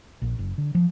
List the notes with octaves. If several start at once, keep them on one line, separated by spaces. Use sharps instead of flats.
A#1
F#1
D3
F3